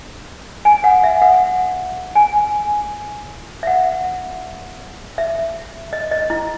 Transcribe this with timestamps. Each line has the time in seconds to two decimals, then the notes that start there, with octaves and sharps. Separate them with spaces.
0.65 G#5
0.84 F#5
1.04 E5
1.22 F#5
2.15 G#5
3.63 E5
3.67 F#5
5.18 E5
5.93 D#5
6.11 D#5
6.30 E4